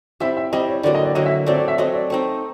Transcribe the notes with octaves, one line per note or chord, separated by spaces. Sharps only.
G3 C4 E4 E5
E5
G3 C4 E4 D#5
C#5
D3 F#3 A#3 D5
D#5
D5
D3 F#3 A#3 D#5
E5
F#3 A3 C4 D5
D5
E5
F#3 A3 C4 D#5
D5
A3 C4 D#4